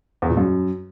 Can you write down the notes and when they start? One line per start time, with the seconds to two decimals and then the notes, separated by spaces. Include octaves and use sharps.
0.22 E2
0.30 A#2
0.37 F#2